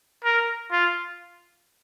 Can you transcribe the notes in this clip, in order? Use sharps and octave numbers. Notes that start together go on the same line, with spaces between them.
A#4
F4